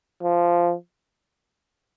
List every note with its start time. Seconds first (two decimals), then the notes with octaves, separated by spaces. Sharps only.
0.23 F3